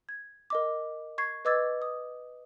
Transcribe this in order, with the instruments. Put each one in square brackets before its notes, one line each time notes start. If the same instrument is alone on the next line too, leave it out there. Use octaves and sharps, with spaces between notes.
[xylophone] G#6
A#4 D#5 D6
C#6 G#6 C7
B4 D#5 D6 E6 G#6 A6
D#6